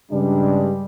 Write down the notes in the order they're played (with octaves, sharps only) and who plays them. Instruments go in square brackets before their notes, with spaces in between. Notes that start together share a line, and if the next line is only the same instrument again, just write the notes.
[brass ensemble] G2 C#3 G3 G#3 D4